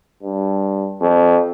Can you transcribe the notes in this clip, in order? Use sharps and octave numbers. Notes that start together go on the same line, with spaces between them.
G2
F2